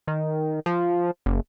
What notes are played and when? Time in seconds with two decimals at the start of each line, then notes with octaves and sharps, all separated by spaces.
0.07 D#3
0.66 F3
1.26 F#1